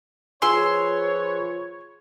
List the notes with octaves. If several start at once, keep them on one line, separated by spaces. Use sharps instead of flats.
F3 F4 G#4 B4 C#5 G#5 C6 E6